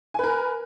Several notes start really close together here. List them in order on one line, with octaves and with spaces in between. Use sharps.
G#5 B4 A#4